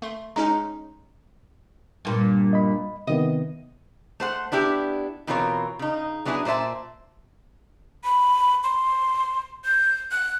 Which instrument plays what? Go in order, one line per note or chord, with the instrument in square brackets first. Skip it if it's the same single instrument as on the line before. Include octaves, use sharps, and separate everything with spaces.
[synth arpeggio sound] A3 C6
[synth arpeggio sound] G#3 C#4 D#4 [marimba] A#5
[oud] G2 A#2
[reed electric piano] D#5 B5
[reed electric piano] C3 D#3 B3 [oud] D#5
[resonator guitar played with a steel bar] A3 C5 F#5
B3 D4 E4 G4
B2 E3 C4 F4 A#4 C#5
C#3 D#4
F#3 B3 D4 E4 G#4
A#2 C5 D5 E5 A5
[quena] B5
C6
G6
F#6